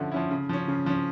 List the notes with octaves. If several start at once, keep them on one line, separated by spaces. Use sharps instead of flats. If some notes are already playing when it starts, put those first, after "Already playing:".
Already playing: D3 F3 C#4 E4
F3 C#4 E4
C#3
F3 C#4
C#3
F3 C#4